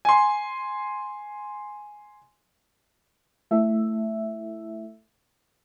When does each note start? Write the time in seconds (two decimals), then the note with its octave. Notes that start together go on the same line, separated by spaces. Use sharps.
0.05 G#5 C6
3.51 A3 E4 A4 E5